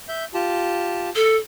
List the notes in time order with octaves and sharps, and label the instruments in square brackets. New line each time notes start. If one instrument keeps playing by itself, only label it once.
[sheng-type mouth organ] E5 G6
F4 G4 A5
[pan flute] A4